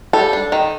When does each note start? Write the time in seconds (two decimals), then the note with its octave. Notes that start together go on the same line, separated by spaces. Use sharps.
0.13 G3 A4
0.33 D4
0.52 D#3